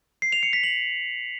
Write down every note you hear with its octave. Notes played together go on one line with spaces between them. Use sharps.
C7
F7
C#7
B6
F#7